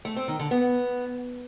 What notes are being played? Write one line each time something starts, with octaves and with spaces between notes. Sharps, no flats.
A3
C4
D#3
D3
B3